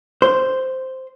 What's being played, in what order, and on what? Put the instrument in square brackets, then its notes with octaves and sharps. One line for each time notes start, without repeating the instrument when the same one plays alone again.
[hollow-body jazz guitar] C5